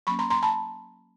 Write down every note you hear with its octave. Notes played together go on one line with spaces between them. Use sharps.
F#3 A#3 C#4 B5 C#6
A#5 C6
A#5 C6
A5 B5